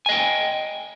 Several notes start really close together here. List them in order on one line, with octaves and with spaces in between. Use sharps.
G#5 D#5 G5